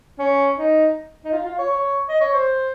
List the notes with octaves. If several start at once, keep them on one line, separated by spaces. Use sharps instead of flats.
C#4
D#4
D#4
F4
F4
C#5
C#5
D#5
C#5
C5